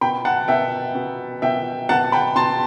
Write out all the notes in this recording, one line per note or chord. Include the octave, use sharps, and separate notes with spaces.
B2 G5 B5
F#5 A5
B2 E5 G5
B2
B2 E5 G5
B2 F#5 A5
G5 B5
B2 A5 C6